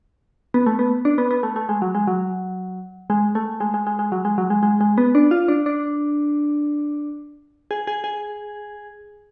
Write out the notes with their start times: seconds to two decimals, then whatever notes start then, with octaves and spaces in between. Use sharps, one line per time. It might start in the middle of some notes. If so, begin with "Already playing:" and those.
0.54 B3
0.66 A3
0.79 B3
1.05 D4
1.18 B3
1.31 B3
1.43 A3
1.56 A3
1.69 G#3
1.82 F#3
1.95 G#3
2.07 F#3
3.10 G#3
3.35 A3
3.60 G#3
3.74 G#3
3.87 G#3
3.99 G#3
4.12 F#3
4.25 G#3
4.38 F#3
4.50 G#3
4.63 G#3
4.81 G#3
4.98 B3
5.15 D4
5.31 F4
5.48 D4
5.66 D4
7.71 G#4
7.87 G#4
8.04 G#4